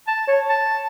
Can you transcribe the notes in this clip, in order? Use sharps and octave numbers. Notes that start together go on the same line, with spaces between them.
A5
C#5
A5